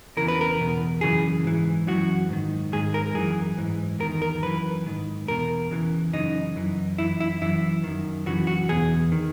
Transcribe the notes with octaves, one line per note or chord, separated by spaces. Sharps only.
E2 C#3 E3 A#4
B4
A#4
E2 B2
F#2 C#3 E3 G#4
G#2 E3
F#2 E3 F#4
G#2 D#3
G#2 D#3 G#4
A#4
F#2 E3 G#4
G#2 E3
E2 D#3 A#4
A#4
F#2 E3 B4
G#2 D#3
E2 B2 A#4
E2 C#3 E3
F#2 C#3 E3 D#4
F#2 E3
F#2 E3 E4
E4
F#2 E3 E4
F#2 D#3
F#2 C#3 E3 F#4
F#4
E2 B2 G#4
D#3